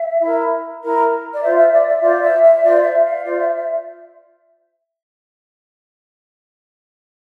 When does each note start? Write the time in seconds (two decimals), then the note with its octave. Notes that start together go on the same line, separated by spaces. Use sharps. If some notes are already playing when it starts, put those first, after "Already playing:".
Already playing: E5
0.20 E4 A#4
0.81 E4 A#4
1.32 D5
1.41 F4 C5 E5
1.57 E5
1.72 D5
1.87 E5
2.02 F4 C5 D5
2.22 E5
2.42 E5
2.62 F4 C5 D5
2.83 E5
3.03 F5
3.23 F4 C5 D5
3.38 E5
3.54 E5